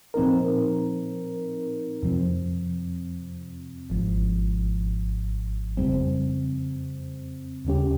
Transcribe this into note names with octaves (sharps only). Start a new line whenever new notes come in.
A#2 F3 C4 D#4 A#4
F2 C3 F3 C4
G#1 G#2 F3
F2 C#3 G3 C4
D#2 C#3 G3 C#4 G4